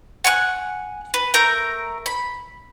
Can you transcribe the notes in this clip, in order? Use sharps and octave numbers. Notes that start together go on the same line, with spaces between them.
F#5 G#5 C#6 F#6
B4
A3 A#4 A#5 G6
B5